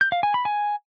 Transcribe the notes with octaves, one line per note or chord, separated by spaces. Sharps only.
G6
F5
G#5
B5
G#5